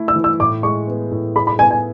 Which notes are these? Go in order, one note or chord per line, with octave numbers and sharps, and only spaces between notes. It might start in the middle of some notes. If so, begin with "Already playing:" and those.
Already playing: A3 E4
E6
E3
E6
A2 D6
G#3 C#6
B3
A2
G#4 B5
B5
B3 G#5
G#5